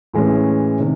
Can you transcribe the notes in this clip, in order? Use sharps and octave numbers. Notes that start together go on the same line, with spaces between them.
A2 E3 G#3 C#4
C3 D#3